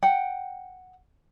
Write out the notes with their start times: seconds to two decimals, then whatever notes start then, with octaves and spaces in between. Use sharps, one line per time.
0.03 F#5 G5